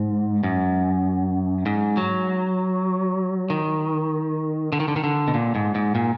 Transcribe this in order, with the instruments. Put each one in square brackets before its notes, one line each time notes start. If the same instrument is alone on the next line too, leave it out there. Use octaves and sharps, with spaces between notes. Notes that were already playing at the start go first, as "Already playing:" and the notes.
Already playing: [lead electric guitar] G#2
F#2
G#2
F#3
D#3
D3
D#3
D3
D#3
D3
B2
A#2
G#2
G#2
A#2